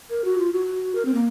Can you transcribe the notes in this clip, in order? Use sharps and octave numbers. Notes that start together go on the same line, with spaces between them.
A#4
F#4
F4
F#4
A#4
C4
A#3